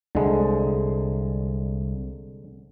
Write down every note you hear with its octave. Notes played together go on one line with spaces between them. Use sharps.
C2 D3 G#3